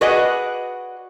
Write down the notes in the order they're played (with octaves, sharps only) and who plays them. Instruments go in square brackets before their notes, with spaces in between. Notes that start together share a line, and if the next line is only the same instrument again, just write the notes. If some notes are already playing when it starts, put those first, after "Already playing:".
[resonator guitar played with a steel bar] F#4 G#4 B4 D5 D#5 F#5